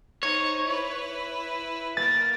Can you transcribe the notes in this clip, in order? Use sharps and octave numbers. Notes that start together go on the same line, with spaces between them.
D#4 C5 C#5
E4 B4
A#3 A#4 A6